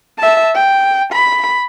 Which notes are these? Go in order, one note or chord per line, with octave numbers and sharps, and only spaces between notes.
E5 A5
G5
B5